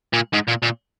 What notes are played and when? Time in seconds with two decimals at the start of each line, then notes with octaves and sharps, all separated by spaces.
0.13 A#2
0.33 G#2
0.48 A#2
0.62 A#2